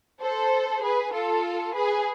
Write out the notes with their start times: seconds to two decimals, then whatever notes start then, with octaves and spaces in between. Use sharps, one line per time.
0.22 A4 C5
0.84 G#4 B4
1.15 F4 A4
1.76 G#4 B4